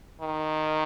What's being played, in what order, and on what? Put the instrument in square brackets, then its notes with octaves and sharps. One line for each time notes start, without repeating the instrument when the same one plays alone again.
[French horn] D#3